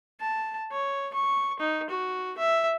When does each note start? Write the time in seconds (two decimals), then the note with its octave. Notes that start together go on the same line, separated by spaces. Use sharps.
0.21 A5
0.72 C#5
1.14 C#6
1.60 D#4
1.90 F#4
2.38 E5